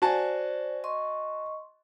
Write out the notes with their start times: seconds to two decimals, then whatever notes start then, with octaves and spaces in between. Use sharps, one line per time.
0.02 F#4 C5 D5 G#5 A5
0.84 D#5 C6 C#6